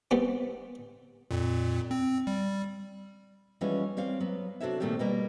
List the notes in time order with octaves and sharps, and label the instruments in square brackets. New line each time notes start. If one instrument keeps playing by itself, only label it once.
[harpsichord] G3 B3 C4
[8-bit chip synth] F2 A#2
C4
G3
[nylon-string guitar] E3 F3 G3 G#3 B3 C#4
G3 C4 C#5 F5
F#3 B3
C3 D4 F#4 A4 C#5 E5
A#2 D#3 A3 A#3 C4 G4
B2 G3 A#3